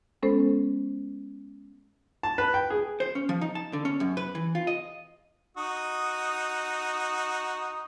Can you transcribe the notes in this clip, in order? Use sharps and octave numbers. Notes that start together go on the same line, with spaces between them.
G#3 B3 C#4 A4 C5
A5
B4
G5
G#4
C5
C#4
F3
D#4
A5
D3
C#4
F#2
B4
E3
F4
D#5
D#4 F#4 D#6